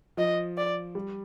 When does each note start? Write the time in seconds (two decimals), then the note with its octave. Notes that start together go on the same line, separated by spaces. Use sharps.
0.17 F3 D#5
0.57 D5
0.95 G3